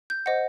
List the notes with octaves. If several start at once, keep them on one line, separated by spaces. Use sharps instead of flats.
G6
C5 D#5 F#5